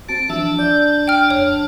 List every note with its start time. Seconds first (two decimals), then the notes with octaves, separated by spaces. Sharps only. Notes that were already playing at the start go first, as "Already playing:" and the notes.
0.09 C4 F#4 A5 A6 D7
0.30 E3 F3 D4 E5 A5 E6
0.59 D5 G6
1.08 G5 F6 D7
1.30 F2 C#5 F6